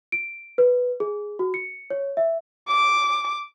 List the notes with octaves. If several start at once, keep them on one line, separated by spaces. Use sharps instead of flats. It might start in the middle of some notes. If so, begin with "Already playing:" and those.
D7
B4
G#4
F#4
C#7
C#5
E5
D6